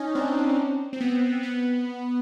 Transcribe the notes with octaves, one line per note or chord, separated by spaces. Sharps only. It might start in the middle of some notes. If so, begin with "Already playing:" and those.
Already playing: C#4 D#4
C4 D4
C4
B3
B3